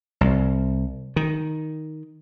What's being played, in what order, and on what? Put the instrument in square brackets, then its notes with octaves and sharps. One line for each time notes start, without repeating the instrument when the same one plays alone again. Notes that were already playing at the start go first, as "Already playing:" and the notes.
[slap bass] C2
D#3